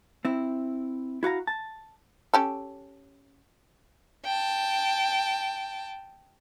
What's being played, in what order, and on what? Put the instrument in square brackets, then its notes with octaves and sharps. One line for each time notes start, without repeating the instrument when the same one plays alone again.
[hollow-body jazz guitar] C4 E4
E4 F#4 F5 A#5
A5
[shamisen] C#4 G4 A4
[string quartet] G5 A5